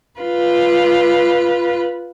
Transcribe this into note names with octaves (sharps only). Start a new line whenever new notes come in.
F4 B4